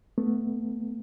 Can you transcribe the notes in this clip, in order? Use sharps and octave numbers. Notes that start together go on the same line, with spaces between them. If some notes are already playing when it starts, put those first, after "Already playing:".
A3 B3